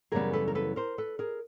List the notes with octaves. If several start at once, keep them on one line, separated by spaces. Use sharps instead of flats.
F#2 C#3 E3 G3 B3 G#4 A#4
A4 B4
A#4
A4 B4
A#4 C5
A4 B4
G#4 A#4